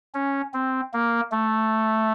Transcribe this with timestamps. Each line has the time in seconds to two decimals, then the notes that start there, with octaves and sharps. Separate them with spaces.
0.14 C#4
0.54 C4
0.93 A#3
1.32 A3